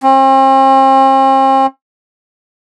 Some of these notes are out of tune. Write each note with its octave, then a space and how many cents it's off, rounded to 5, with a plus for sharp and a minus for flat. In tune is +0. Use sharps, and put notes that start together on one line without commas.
C4 +40